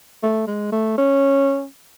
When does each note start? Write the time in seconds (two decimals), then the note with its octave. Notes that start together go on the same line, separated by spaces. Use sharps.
0.23 A3
0.47 G#3
0.72 A3
0.98 C#4